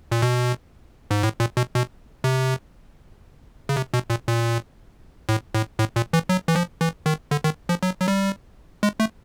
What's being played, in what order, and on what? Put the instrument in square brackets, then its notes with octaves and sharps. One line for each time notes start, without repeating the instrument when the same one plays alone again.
[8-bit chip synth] A#2
B2
G#2
A2
A#2
B2
B2
C3
C#3
C3
B2
A#2
A#2
A2
A2
A2
A#2
E3
F#3
E3
F3
E3
D#3
D3
D#3
F3
F#3
F#3
G3
G#3
A3